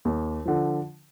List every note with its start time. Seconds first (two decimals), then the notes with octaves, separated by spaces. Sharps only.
0.05 D#2
0.45 D3 F3